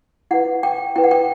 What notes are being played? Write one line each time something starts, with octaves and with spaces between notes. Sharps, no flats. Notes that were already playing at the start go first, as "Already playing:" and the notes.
E4 B4 F#5
G5
E4 B4 G5
F#5
G5